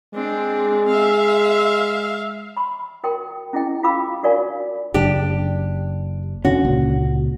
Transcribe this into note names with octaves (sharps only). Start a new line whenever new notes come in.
G#3 C4 D4
E5 F5
B5 C6
F#4 A#4 G5 C6 D#6
C#4 E4 G#4 D#5 G5
F4 A4 F5 B5 D6 E6
D4 F#4 A#4 D5 F5 G#5
F#1 D4 G4
E1 D3 C#4 F#4
C#2 A#2